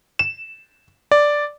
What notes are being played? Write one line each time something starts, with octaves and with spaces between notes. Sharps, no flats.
E7
D5